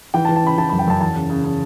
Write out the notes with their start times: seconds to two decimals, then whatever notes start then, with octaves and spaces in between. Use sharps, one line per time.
0.14 E3 G5
0.25 A5
0.29 E3
0.36 A5
0.43 C#3 B5
0.58 E3 A5
0.69 F#2 B5
0.79 G5
0.87 F#2 A5
1.01 E2 A5
1.16 C#3
1.30 C#3
1.44 C#3